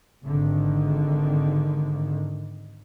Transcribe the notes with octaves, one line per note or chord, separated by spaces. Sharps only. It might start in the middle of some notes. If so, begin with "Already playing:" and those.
G#1 D3 D#3